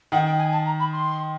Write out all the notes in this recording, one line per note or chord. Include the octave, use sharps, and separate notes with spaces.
D#3 F#5
G5
G#5
A5
A#5
B5
C6